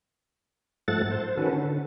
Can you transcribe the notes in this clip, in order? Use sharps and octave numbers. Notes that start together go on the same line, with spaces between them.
G#2 F3 A3 A4 F#5 A6
C5
D#3 C#4 F#4 A4 B4
D3